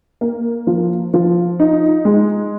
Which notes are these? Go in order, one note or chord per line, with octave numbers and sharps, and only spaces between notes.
A#3
F3
F3
D#4
G#3